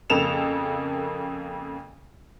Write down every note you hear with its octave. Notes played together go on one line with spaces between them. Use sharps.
F2 C#3 A#3 A4 E7 F7